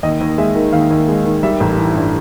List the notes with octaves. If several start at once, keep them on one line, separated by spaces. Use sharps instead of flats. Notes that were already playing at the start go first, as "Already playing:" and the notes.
D#2 D#5
D#2
G#3 E5
D#3
D#2 F5
D#2
G#3
D#3
G3 E5
A1
E3
G2